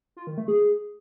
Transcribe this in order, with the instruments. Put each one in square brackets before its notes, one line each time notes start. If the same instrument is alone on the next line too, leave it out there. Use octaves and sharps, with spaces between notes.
[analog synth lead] F4
D#3
A3
G#4